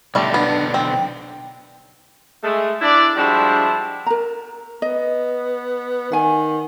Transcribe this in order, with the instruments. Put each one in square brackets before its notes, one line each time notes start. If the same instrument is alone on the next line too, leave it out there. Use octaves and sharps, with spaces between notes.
[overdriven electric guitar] B1 D3 [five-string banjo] G3 A3
[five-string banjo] B3 [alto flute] D4
[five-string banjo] C4 [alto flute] G5
[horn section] G#3 A3
D4 E4 D5
F3 G3 G#3 D4 E4 F#4
[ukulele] A#4 A#5
[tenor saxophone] B3 [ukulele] D#5
[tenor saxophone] D#3 [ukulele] F#5 G#5